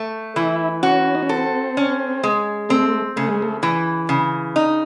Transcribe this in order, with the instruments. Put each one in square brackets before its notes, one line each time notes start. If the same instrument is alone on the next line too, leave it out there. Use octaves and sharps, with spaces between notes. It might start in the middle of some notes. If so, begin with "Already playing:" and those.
Already playing: [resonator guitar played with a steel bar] A3
[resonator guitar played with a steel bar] E3 [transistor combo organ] E4
[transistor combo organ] C#4 [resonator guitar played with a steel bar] F#4
[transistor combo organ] D#4
C#4
[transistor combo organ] C4 [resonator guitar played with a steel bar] A4
[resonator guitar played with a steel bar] C#4
G#3
[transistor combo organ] A3 [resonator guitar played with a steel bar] C4
[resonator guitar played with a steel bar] C#3 [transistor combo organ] A3
[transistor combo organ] G#3
A3
[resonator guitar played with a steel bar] E3
C#3
D#4